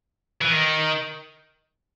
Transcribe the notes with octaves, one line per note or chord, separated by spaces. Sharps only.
E3
D#3